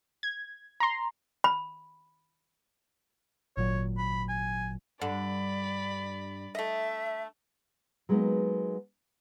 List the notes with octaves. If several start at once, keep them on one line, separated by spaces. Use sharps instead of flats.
G#6
A#5 C6
B5
G#1 A#2 F#3 C#5
B5
G#5
G2 D3 D5 B5
A3 D#5 E5
F#3 G#3 A#3 B3 D#4